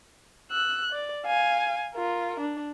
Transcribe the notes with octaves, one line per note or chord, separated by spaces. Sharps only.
E6 F#6
D5
F5 G#5
F4 A#4
D4